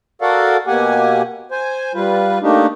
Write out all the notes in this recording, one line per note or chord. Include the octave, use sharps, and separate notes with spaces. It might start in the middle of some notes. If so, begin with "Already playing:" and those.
F#4 A4 A#4 D5 F5 F#5
B2 A#3 G4 F#5 G#5
C5 G#5
G3 F4 B4
A3 A#3 D4 D#4 G4